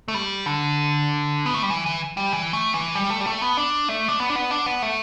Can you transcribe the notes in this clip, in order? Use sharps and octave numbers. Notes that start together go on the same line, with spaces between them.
A3
G3
D3
B3
A3
G3
E3
E3
G3
E3
A3
E3
G3
A3
G3
A3
B3
D4
A3
D4
B3
D4
B3
D4
B3
A3